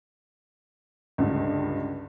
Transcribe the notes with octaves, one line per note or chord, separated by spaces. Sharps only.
C#2 G2 D3